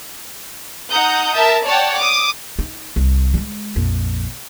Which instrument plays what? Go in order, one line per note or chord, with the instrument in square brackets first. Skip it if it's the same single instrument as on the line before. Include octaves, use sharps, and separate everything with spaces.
[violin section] D#4 F#5 A#5 D#6 G6
A#4 E5 A5
C#5 D5 F#5 G5 A5
D6 D#6
[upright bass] D#4
C2
G3 G#3
A#1 F2